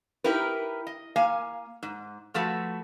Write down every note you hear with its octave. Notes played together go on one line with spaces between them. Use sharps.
D#4 E4 G4 A#4 B4
D#5
A#3 F5 G#5
G#2
F3 A3 F#4 A4 B4